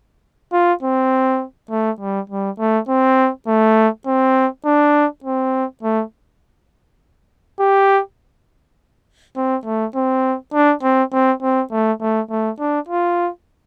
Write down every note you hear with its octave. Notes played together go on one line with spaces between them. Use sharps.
F4
C4
A3
G3
G3
A3
C4
A3
C4
D4
C4
A3
G4
C4
A3
C4
D4
C4
C4
C4
A3
A3
A3
D4
F4